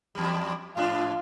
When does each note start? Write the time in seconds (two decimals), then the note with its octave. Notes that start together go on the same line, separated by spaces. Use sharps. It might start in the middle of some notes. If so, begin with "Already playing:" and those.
0.15 E2 G3
0.77 G#2 D4 F4